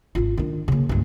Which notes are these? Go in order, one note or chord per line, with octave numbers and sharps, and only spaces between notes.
G#1 F4
D#3 D4
C#3 A#3
C#2 G2